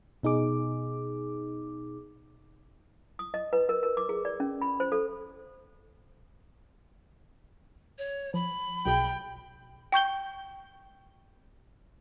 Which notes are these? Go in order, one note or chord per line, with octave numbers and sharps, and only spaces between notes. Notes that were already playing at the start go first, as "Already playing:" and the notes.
B2 D#4 G#4 D6
D#6
D#5
B4
A#4
A#4
D6
G#4
D5
C#4
B5
C5
A4
C#5
F3 B5
B1 B2 G#4 G5
G5 C#6 G6 G7